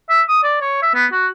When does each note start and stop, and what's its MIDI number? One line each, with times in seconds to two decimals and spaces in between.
0.09 0.22 76
0.29 0.39 87
0.43 0.57 74
0.61 0.82 73
0.82 0.90 76
0.94 1.06 59
1.12 1.27 66